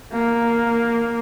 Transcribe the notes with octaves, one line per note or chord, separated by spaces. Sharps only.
A#3